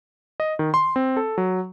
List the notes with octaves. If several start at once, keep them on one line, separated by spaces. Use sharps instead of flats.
D#5
D#3
C6
C4
A4
F#3